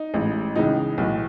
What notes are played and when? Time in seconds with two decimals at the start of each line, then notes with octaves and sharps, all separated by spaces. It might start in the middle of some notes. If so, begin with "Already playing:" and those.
Already playing: D#4
0.14 A1 G#2 E3
0.55 C#2 C#3 E3 D#4
0.98 B1 A2 E3